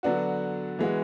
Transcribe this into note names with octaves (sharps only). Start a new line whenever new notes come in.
D3 F#3 B3 D4 F#4
E3 G#3 B3 F#4